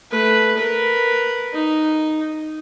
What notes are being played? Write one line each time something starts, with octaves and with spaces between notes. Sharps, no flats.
A3 B4
A#4 B4
D#4